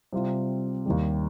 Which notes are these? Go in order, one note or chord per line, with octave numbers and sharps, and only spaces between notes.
C3 G3 C4 F4
D#2 D#3 G3